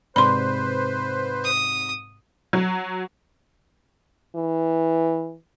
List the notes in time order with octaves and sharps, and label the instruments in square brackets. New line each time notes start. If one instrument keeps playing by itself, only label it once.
[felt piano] G#2 C3 D5 [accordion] B4 C5 [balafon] B5 C6
[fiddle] D#6
[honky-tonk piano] F#3
[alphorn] E3